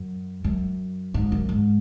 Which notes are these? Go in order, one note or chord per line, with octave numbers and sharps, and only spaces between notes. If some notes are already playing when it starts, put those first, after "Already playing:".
Already playing: F#2
F#2
G#2
F#2
G#2